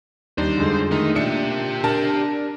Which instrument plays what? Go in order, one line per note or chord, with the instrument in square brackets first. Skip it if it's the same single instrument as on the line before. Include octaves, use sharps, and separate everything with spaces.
[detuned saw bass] D#2 [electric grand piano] G3 D4 D#4 [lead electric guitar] C5
[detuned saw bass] F2 [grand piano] D3 G#3
[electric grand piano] D#3 A3 [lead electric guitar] D#4
[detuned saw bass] A#2 [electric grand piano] D4 [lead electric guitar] G4 E5 [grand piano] C#7
[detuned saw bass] D4 [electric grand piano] A#4 [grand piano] A5